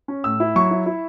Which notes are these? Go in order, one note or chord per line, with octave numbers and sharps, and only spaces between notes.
C#4
A2 E6
E4
F#3 C#6
E4
E4